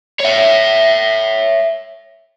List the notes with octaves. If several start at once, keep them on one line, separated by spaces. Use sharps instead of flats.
C#5 E5